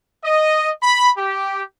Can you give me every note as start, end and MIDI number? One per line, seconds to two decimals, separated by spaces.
0.24 0.71 75
0.82 1.10 83
1.17 1.62 67